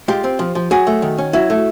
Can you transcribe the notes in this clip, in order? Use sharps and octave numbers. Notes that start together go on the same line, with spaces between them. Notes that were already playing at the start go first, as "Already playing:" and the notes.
G#3 F4 G4
C4
F3
F3
F#3 F#4 G#4
A3
D#3
C#4
F#3 E4 F#4
A3